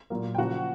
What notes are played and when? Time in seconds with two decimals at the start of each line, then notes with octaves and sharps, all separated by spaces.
0.10 A#2 F#3 A#3
0.35 G5
0.38 C#3 F3 A#3 F#4 F#5